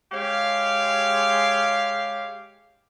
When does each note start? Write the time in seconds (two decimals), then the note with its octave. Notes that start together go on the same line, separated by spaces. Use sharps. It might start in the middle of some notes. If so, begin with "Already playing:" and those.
0.12 G#3 G4 C#5 F5